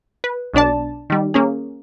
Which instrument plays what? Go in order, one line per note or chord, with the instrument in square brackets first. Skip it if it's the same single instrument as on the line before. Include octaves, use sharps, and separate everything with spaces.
[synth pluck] B4
B1 B2 D4 D5 A5
D#3 G3
A#3 C#4 G#4